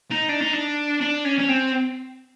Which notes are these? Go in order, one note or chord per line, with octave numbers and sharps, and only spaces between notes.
D#4
D4
D#4
D4
D4
C#4
C#4
C4